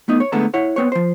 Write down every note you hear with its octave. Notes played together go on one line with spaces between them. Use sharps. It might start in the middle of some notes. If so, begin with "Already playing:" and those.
A3 B3 D#4 D#5
C#5
D3 G#3 A3 B3 A5 A#5
E4 C#5 F#5
B3 C4 B4 C#5
F3 C5